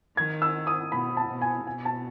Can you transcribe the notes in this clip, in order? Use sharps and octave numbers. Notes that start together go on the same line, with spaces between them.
D#3 G#6
E6
D#6
B2 B5
A5
B2
G#5
B2 G#5
A5